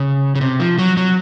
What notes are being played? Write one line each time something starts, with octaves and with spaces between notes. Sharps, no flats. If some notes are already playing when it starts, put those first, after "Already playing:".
Already playing: C#3
C#3
C3
F3
F#3
F#3